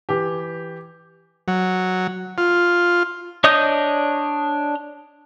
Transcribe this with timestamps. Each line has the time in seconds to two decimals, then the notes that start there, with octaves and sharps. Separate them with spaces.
0.09 E3 G4
1.48 F#3
2.38 F4
3.44 D4 C#5 D#5 D#6 G6